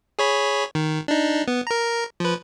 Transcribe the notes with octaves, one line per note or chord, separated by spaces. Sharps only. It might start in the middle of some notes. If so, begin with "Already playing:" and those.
G#4 C#5 B5
D#3
D4 D#4
B3
A#4 A#5
F3 B4